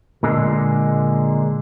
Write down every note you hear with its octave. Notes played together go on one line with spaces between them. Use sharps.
A#2 D3 G#3